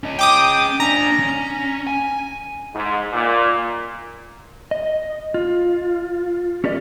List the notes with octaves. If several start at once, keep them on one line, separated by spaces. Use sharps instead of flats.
C#4 D#5
G5 D6 D#6
D4 G#5 A#5
C#4
G#5
G#2
A#2
D#5
F4
C#4 G4 A#4 D5 D#5